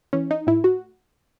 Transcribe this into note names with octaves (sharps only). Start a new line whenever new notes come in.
E3 C#4
D#4
A2 E4
F#4